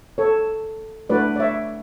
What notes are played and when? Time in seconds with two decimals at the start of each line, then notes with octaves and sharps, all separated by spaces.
0.18 A4 C#5
1.10 A3 D4 F#4 B4 D5
1.36 D5
1.40 C#5 E5